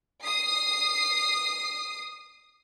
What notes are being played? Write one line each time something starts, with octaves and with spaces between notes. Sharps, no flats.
D#6 C7